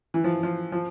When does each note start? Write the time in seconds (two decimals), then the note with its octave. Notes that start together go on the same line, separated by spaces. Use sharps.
0.14 E3
0.24 F3
0.43 F3
0.72 F3